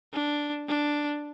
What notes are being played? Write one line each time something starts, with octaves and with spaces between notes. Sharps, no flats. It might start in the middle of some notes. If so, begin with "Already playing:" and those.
D4
D4